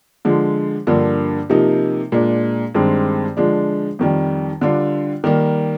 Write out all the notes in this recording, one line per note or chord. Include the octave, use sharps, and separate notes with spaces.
D3 F3 G#3
G2 D3 F3 A#3
C3 F3 A#3 D#4
A#2 G#3 D4
G2 D#3 G#3 C4
D3 F3 G#3 D4
F2 D#3 G3
D3 G3 D4 F4
D#3 G3 A#3